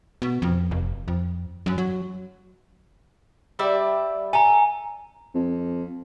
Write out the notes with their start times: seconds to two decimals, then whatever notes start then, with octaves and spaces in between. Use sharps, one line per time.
0.22 B2
0.42 F2
0.71 F1
1.08 F2
1.66 F#2
1.78 F#3
3.59 G3 D5 E5
4.33 A4 G#5 A#5
5.34 F2